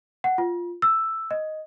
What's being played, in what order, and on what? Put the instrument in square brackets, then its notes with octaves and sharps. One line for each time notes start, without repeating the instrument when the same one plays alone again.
[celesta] F#5
F4
E6
D#5